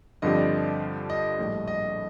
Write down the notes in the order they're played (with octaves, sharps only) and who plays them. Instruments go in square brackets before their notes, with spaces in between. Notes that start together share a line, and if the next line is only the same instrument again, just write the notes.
[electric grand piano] G2 D3 F3 C4 G4 [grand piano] D#5
[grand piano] D5
D#5
[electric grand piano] A#1 A2 G3
[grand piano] D#5